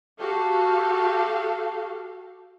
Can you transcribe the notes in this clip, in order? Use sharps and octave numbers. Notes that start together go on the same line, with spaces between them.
F#4 G4 A4 F5